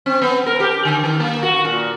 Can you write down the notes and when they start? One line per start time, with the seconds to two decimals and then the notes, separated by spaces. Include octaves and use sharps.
0.06 C4
0.22 B3
0.46 A#4
0.60 G4
0.85 D3
1.04 D#3
1.20 A#3
1.43 F#4
1.65 A#2